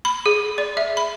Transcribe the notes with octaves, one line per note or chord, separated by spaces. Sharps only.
B5
G#4
D5
E5
B5